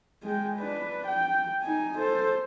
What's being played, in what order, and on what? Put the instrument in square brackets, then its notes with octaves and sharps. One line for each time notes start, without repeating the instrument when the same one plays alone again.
[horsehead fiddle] G#3 G5
D4 B4
G5
D#4 G#5
A4 C5